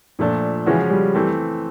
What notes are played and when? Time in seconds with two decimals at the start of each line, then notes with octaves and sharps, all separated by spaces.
0.19 A#2 F3 A3 D4
0.66 C#3 E3 F3 G#3 C#4 F#4
0.90 G3
1.15 E3 A3 C4